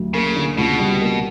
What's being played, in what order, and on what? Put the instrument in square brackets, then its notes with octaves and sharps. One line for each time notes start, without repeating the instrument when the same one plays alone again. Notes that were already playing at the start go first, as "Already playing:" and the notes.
Already playing: [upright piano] D2 F#3
[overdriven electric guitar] C#3 [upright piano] A#3
[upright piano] D3
[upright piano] C#2 [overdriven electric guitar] B2
[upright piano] G3
A#3